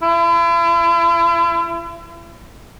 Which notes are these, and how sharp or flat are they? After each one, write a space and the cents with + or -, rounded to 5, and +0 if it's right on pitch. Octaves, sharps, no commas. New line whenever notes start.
E4 +40